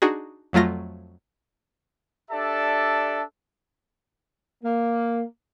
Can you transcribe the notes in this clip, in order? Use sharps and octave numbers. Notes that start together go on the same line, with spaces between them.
D4 D#4 F#4 G#4
F2 F#3 A3 F4 A#6
D4 G4 A4 D5 E5 A5
A#3